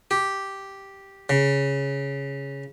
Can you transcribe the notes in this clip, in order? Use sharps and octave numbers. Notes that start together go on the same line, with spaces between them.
G4
C#3